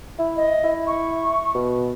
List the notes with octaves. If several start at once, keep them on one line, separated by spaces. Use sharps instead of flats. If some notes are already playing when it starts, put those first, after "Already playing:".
E4
D#5
E4
C#6
B2